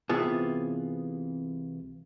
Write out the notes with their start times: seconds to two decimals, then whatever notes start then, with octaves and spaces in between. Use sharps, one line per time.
0.09 C2 C3 E3 B3 F4 G#4